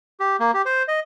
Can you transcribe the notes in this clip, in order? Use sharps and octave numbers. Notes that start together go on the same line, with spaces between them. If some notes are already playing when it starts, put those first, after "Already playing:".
G4
A#3
G4
C5
D#5